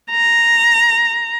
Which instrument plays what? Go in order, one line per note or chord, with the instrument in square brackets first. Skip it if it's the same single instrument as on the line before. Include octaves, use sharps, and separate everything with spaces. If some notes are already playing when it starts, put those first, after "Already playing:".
[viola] A#5